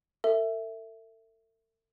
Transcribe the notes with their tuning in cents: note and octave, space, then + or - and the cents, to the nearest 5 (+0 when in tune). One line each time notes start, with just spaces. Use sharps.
A4 +45 E5 +0